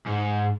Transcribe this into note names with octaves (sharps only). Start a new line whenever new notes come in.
G#2